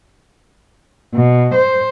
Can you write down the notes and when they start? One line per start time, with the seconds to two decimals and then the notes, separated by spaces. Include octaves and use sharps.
1.14 B2
1.55 C5